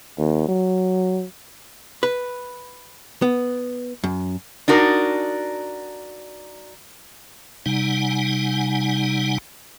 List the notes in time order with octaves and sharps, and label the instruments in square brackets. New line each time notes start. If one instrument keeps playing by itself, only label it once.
[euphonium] D#2
F#3
[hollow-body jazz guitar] B4
B3
F#2
[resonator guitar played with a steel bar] D4 D#4 F#4 A#4
[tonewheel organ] C3 G3 D#4 F#5 G#5